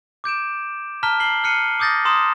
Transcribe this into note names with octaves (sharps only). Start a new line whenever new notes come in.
D6 G6 D7 E7
A5 A#5 F6 B6 G7
C7 F#7 G7
F6 F#6 C7 C#7 D#7
D6 D#6 G6 A6 A#6
A#5 C6 D#6 E7